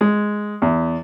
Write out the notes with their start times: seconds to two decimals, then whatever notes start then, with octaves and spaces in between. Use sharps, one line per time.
0.01 G#3
0.62 E2